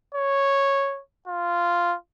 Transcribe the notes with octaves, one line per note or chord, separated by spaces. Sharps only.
C#5
F4